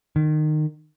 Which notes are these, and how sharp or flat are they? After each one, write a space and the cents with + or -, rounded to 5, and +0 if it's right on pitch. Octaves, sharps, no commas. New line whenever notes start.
D#3 -25